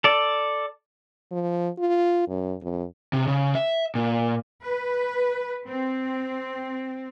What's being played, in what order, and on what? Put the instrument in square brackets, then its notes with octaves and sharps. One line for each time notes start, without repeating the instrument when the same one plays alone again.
[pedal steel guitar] A4 D5
[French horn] F3
F4
F#2
F2
[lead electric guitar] C3
C#3
E5
A#2
[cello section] B4
C4